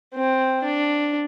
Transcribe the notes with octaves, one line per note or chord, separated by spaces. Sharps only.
C4
D4